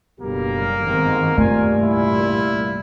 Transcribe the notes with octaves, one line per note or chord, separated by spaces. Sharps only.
F#1 B2 D3 G3 A#3 G4 A#4
G1 G#2 D#3 C4
C2 G2 A#2 G3 A3 F4 D5 G#5
E4 F4